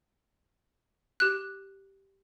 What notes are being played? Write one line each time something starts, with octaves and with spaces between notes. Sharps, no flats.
G4 F#6